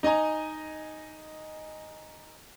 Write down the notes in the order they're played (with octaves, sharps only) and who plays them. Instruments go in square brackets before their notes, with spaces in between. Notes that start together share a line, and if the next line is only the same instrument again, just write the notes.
[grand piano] D#4 D#5 G#5 A#5